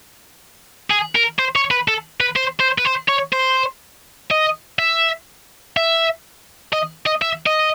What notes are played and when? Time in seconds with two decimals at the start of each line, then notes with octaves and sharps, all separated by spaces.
0.90 G#4
1.15 A#4
1.39 C5
1.56 C#5
1.71 B4
1.88 A4
2.21 B4
2.36 C5
2.60 C5
2.78 B4
2.85 C5
3.09 C#5
3.33 C5
4.31 D#5
4.79 E5
5.77 E5
6.73 D#5
7.06 D#5
7.22 E5
7.47 D#5